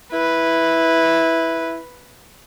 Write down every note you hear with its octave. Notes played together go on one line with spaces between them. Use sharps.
E4 B4